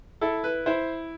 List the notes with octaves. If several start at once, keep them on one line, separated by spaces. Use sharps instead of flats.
E4 A4
B4
E4 C5